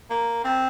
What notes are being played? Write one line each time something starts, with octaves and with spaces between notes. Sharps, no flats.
A#3
C4